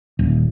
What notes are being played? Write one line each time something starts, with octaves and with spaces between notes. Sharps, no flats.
D#1